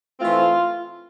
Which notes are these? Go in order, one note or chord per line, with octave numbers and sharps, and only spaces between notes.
E3 A3 C4 F4